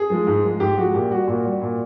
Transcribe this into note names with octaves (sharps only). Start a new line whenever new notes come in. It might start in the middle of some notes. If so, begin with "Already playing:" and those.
Already playing: G#4
F3 G#3
G#2
F3 G#3
G#2 G4
F3 G#3 F#4
A#2 G4
G3 F#4
A#2 F#4
G3
A#2